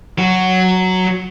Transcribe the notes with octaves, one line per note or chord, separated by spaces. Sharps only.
F#3 F#4